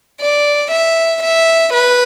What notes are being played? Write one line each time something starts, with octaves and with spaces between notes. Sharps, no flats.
D5
E5
E5
B4